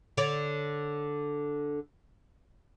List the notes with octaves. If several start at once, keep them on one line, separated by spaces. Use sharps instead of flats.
D3 C#5 D5